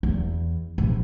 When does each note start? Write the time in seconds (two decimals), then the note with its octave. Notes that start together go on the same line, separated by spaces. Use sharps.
0.03 E2
0.78 A#1